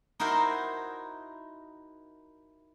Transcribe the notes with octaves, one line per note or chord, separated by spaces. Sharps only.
D#4 E4 F#4 A#4 C5